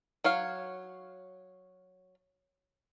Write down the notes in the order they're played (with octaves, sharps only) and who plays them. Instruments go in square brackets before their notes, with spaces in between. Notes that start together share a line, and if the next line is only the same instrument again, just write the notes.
[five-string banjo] F#3 C#5 F5